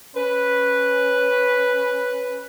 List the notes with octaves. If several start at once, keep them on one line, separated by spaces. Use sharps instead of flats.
C#4 B4